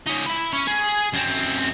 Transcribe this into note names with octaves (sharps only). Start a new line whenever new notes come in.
C#4 D#4
E5 B5
C#4
G#4
F#2 C4